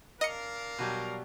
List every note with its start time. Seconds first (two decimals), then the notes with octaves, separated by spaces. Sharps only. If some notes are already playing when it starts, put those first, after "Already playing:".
0.21 D4 A#4 D#5 F5 C#7
0.78 B2 F#3 G3